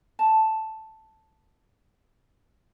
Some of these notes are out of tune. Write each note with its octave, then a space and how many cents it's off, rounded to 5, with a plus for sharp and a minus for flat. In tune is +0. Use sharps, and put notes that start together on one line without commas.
A5 +0